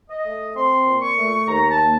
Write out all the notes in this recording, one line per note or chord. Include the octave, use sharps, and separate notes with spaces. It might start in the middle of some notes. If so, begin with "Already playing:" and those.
D#5
A3
C4 C6
A#2
C#6
A3
D#2 A#5
A5
A#3